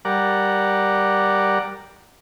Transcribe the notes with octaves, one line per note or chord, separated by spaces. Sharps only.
G3 A#4 D5 F#5